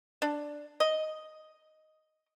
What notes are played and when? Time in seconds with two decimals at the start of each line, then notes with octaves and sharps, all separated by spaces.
0.22 D4
0.80 D#5